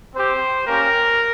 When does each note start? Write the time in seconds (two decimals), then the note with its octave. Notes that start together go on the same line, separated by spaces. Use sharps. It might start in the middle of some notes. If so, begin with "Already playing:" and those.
0.14 C4 G4 C5
0.66 A#3 C#4 G4 A#4